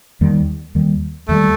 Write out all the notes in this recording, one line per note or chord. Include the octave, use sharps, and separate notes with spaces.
D#2 D#3 G3
D#2 D#3 G3
D#2 D#3 G3 A3